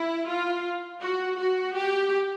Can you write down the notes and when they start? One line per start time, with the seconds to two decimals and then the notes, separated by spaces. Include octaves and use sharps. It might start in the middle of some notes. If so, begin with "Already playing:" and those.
Already playing: E4
0.27 F4
1.01 F#4
1.37 F#4
1.75 G4